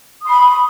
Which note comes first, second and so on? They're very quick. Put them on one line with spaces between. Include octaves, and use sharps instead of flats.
D#6 C6 B5